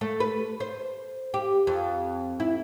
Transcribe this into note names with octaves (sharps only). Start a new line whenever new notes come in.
A3
B4
C5
G4
F2
E4